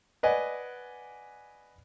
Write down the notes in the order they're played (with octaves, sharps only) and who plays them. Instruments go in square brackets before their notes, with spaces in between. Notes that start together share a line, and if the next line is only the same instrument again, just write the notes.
[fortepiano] B4 D5 D#5 F#5 G#5